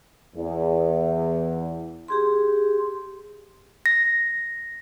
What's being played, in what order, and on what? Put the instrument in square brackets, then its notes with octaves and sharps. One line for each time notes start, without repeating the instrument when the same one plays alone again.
[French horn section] E2
[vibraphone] G4 G#4 C6
[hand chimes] A#6